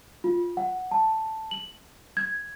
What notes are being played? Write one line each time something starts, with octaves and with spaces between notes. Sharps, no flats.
F4
F#5
A5
F#7
G#6